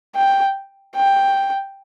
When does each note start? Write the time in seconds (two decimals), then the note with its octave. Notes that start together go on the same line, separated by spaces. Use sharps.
0.15 G5
0.96 G5